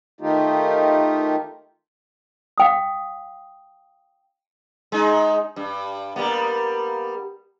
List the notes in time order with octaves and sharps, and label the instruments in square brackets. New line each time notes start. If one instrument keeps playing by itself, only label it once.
[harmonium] D#3 A3 D#4 F4 G4
[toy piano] F5 G5 D#6
[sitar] G#3 D#4
G2
G3 A#3 B3